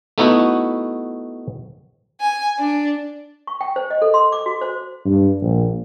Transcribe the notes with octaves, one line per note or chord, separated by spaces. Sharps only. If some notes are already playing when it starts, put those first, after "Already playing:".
A3 B3 D#4 E4 F#4
G#5
D4
C#6
G5
C5
D#5
A4
C6
D6
F#4
C5
G2
A#1